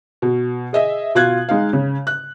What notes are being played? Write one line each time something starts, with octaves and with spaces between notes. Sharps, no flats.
B2
G#4 D#5 E5
B2 F4 F#6 G#6
G#3 D#4 F5
C#3
F#6